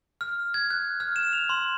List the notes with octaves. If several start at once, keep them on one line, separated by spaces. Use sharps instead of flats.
F6
G#6
F#6
F6
E7
F7
C6